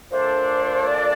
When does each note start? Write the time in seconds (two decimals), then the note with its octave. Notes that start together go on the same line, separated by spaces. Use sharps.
0.11 A#2 A3 D4 A4 C5
0.87 D5